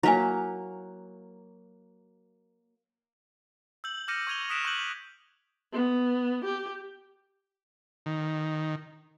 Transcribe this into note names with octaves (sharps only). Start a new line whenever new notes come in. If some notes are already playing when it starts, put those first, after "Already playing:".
F#3 A#3 E4 F5 G#5
E6 G6 F#7
D6 F6 G6 A#6 C#7 D#7
C#6 E6 G#6 D#7 F7 G7
D#6 F#6 B6 D7 E7
C#6 F#6 G6 F#7
B3
G4
D#3